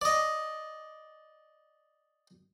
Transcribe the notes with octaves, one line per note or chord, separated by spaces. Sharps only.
D5 D#5